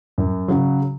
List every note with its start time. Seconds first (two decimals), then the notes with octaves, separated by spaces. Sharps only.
0.18 F#2
0.48 C#3 F#3